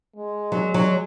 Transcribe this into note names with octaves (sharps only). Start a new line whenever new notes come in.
G#3
F#3
F#3